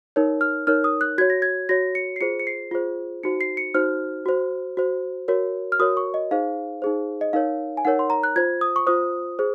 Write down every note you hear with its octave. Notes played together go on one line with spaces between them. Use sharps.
D#4 A#4 C#5
F6
D#4 A#4 C#5 F6
D#6
F#6
F#4 C#5 G#6
A#6
G#6
F#4 C#5 A#6
C#7
C7
F4 G#4 C5 C#7
C#7
C7
F4 G#4 C5
D#4 F#4 C5 C#7
C7
C#7
D#4 F#4 C5 F6
F#4 C5
F#4 C5
F#4 A#4 C#5
F6
F#4 A#4 C#5 D#6
C#6
D#5
D#4 G#4 C5 F5
D#4 G#4 C5
D#5
D#4 A#4 C#5 F5
G#5
D#4 A#4 C#5 F#5
C6
A#5
F#6
F4 C5 G#6
D#6
C#6
F4 C5 D#6
G#4 C5